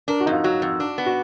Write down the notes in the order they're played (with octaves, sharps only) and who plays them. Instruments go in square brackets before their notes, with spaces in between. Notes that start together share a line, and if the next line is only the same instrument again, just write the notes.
[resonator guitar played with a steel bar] D4 [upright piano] A#4
[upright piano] F#4
[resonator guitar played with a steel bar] F2 [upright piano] D#4
[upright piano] F4
[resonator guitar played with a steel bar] F#3 [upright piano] F#4
[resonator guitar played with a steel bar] F2
D4
B3
[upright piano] F#4